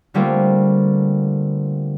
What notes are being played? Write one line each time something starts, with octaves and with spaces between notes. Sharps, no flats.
D3 G3 A3 A#3 C4 F4